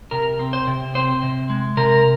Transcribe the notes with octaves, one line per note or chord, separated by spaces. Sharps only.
C3 A#4
C4
C5
C3
C4 C5
C3
G#3
C3 A#4